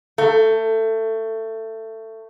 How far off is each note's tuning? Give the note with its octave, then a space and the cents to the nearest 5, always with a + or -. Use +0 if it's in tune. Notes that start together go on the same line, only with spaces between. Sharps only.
A3 +20